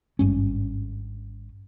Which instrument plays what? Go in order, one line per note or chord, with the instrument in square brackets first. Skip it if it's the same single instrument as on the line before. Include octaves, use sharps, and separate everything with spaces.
[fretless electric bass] G#1 G2 C#4